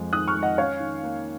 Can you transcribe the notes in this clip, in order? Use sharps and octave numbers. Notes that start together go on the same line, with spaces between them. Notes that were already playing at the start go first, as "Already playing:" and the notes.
Already playing: F2 F3 G#3
D#3 D#6 F#6
C#6 F6
G#3
D#5 F#5
C#4 C#5 F5
D#3
A#3